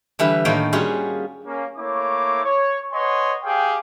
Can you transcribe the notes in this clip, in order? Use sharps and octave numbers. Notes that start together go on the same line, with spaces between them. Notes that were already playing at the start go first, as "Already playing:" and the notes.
D3 E3 G3 B4
A2 D#3 A#3 F4 C#5 G5
G3 C#4 F4 F#4 G#4
A#3 C#4
A3 A#3 E4 C#5 D6
C#5
B4 C#5 D#5 F#5 G#5 C6
G4 G#4 F5 G5